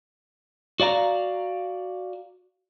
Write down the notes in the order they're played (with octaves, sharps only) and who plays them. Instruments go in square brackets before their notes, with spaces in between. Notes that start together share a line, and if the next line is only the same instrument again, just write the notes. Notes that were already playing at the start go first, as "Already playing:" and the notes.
[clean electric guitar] F#4 D5 F5 A#5